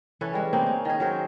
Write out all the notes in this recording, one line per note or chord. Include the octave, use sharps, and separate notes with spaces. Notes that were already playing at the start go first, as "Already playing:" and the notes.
E3 C#4 A4 B4
G3 G#3
A#3 C4 D#4
C#4
D#3 G#4
F#3 A#4 C5